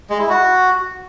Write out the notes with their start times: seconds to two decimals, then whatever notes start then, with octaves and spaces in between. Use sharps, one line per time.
0.10 G#3
0.20 E4
0.29 F#4